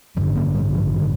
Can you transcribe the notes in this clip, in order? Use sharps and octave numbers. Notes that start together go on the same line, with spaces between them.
A1 G2 D3 G3
A#3
G3
F3
D#3